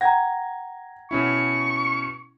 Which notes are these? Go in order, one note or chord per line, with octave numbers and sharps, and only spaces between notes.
F#5 G5 A#5 G#6 A#6
B2 C#4 E4 C#6